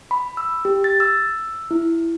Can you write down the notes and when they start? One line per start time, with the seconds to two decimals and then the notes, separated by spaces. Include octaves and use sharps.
0.11 B5
0.37 E6
0.65 G4
0.84 A6
1.00 E6
1.71 E4